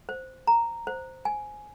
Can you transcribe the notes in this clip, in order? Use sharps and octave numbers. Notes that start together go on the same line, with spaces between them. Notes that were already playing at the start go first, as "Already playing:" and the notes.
C5
A#5
C5
G#5